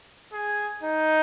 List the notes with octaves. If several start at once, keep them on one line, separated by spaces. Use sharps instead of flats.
G#4
D#4